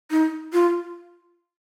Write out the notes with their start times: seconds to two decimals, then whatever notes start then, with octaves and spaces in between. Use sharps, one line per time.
0.11 D#4
0.53 F4